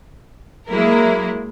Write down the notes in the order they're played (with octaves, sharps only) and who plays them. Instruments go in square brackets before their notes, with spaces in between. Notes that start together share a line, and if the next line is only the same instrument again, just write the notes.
[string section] F#3 G#3 A#3 E4 A#4